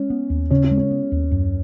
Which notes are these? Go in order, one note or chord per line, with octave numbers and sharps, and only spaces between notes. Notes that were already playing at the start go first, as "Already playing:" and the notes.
Already playing: G#3 C#4
B3
D#2
C#3 C#4
C#4
G#3
C#4
B3
D#2
F#2